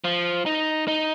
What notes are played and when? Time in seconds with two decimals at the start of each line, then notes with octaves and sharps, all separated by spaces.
0.04 F3
0.46 D#4
0.88 D#4